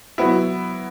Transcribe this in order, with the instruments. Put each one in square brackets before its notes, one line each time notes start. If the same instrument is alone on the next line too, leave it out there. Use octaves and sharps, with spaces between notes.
[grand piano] F#3 B3 E4